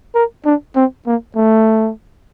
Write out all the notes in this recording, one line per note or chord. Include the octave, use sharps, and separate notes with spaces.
A#4
D4
C4
A#3
A3